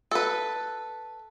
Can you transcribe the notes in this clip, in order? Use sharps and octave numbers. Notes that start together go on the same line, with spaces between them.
A4 B4